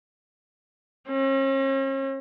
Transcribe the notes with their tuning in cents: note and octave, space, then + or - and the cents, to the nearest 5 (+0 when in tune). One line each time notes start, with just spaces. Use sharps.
C#4 -45